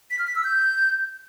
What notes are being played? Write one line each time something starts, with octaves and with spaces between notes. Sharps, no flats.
B6
F6
B6
E6
G6